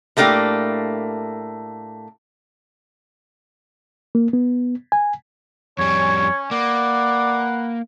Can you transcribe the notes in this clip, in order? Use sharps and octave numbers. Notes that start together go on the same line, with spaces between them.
A2 A3 A#3 D4 G4
A#3
B3
G#5
F2 G3 C#4 C#5
A#3 B4 D5 F#5